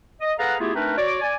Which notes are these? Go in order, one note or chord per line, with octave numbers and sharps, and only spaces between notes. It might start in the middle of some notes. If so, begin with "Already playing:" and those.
D#5
G#4 A4 B4 F5 F#5 A#5
A3 B3 E4 F4 G4 G#4
A3 C4 D4 D#4 A#4 B4
F#4 C#5 D5
D5 G#5